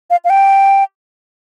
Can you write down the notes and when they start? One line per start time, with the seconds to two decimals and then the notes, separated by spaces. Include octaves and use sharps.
0.10 F5
0.24 F5
0.30 G5